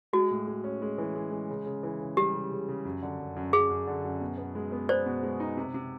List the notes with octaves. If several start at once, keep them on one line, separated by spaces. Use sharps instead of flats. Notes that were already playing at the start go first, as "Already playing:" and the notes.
G#3 F#4
A2
G#3
C#4
G#3
E3
G#3
G#3
C#3
C#3
E3
C#3
G3 G4
C#3
C#3
C#3
F#2
D3
F#2
F#2
F#2 G#4
F#2
D3
F#2
B2
B3
G#3
B3
B3 C5 D5
B2
G#3
D#4
C3
C3